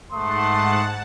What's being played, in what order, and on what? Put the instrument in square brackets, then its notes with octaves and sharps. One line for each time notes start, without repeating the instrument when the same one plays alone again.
[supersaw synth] G#2 F#5 A5 [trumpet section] A3 C6 D#6